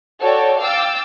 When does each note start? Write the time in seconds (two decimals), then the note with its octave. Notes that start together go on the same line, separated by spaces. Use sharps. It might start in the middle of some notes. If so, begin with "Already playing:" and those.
0.21 F#4 A4 C#5 D5 G5
0.61 F5 G5 D6 E6 A6